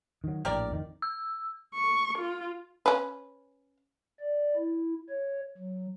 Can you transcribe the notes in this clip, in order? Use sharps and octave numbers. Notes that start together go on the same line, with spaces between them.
D#3 F#3
A#1 A2 G4 A#4 D5
F2 D#3
E6
C#6
F4
C#4 B4
D5
E4
C#5
F#3